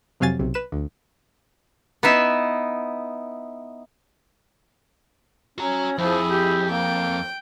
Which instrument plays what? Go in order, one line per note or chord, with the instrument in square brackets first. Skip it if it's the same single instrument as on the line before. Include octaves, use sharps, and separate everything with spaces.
[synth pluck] F2 C3 F#3 F5 G#5 A6
B1 C3
B4 E7
D2
[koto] B3 D#4 E4 E5
[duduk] C#4 [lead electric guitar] F#4 A#5
[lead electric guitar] F2 [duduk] F3 [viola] E4 G#4
[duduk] G4
[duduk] A#3 [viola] G5